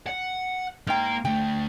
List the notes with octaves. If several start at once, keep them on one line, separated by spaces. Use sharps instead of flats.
F#5
G#2 A#3 G5 A#5
D2 A3 G5